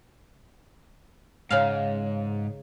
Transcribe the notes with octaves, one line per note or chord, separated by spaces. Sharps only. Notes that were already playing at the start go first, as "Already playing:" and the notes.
G#2 C#3 F5